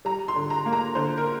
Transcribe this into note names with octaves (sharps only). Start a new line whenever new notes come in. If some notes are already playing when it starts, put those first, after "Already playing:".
G3 A#5
C6
D3
A#5
A#3
A#5
D3 C5
A#4